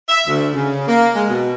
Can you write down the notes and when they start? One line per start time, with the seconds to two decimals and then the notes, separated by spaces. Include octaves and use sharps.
0.09 E5
0.27 D2
0.54 C#3
0.88 A#3
1.15 G#3
1.27 B2